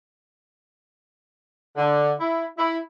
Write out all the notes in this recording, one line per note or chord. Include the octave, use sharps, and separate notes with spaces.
D3
E4
E4